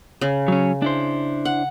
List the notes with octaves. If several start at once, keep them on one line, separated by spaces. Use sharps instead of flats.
C#3
F#3 C#4
D4 E4 C5
F#5